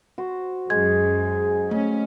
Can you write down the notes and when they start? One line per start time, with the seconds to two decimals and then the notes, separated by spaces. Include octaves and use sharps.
0.18 F#4 C5
0.70 F#2 G#3 G#4 G#6
1.71 A3 C#4